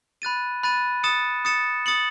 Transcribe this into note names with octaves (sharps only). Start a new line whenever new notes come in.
B5 F#6 A6 D#7
B5 F#6 A6 D#7
D#6 A6 C#7 E7
D#6 A6 C#7 E7
D#6 A6 C#7 F#7